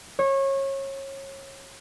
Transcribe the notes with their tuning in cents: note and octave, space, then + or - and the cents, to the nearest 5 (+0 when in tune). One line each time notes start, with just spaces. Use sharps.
C#5 -25